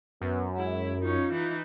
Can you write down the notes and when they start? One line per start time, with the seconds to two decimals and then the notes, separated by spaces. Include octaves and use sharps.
0.21 F#2 B3
0.57 G#3 E4
1.02 C#4 D#4 F4
1.32 E3 D#4